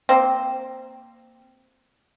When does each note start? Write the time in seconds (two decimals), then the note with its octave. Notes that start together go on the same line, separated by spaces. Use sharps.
0.09 A#3 C4